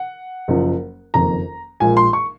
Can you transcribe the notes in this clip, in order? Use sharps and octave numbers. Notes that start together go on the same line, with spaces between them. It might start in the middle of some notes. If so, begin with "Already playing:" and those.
Already playing: F#5
F#1 F#2 F3
F#1 F2 D#3 A#3 A#5
A#1 A#2 G#3 G#5
C6
C#6